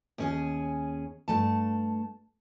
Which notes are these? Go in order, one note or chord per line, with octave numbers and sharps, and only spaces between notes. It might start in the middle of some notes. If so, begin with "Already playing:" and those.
D#2 C#4 G#4
G2 A3 A5